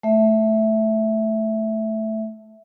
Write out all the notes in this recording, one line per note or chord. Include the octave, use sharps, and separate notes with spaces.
A3 E5